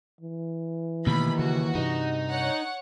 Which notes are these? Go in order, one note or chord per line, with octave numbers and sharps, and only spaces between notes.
E3
D#2 B2 D#3 A3 B5
C#3 F#4
G2 C3 D#4
C#5 F#5